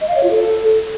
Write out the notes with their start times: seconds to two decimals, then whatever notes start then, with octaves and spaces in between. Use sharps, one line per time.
0.01 D#5
0.09 F5
0.16 C#5
0.23 F4
0.31 A4